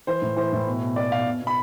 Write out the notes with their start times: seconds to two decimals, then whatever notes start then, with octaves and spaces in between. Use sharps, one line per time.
0.07 E3 C5
0.22 A2
0.37 E3 C5
0.53 A2
0.67 B2
0.81 B2
0.96 B2 D5
1.11 B2 F5
1.27 B2
1.41 B2
1.47 B5